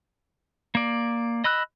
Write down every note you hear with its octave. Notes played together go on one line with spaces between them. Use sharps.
A#3 D5
D#5 B5 E6 F#6